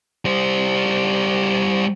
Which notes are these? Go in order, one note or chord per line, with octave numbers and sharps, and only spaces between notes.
G3 C5